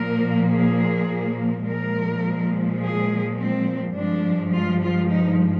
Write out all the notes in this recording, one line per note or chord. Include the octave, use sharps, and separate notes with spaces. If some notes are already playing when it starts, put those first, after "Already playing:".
Already playing: A#2 F3 A#3 A#4
G#4
A#2 F3 G#3 A#4
G#4
C4
G2 F3 G#3 D4
F4
F4
D#4